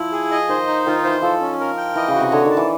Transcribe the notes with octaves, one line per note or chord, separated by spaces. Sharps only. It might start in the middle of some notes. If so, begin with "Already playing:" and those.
Already playing: F3 E4
G#4
D#5
D#3 C5
D#4
D#3 F4
E3 C5
F3 A4
C#4
A#4
G5
E3 D#5
C#3
F#4
C3
D3 C#5
D#3
A5
E3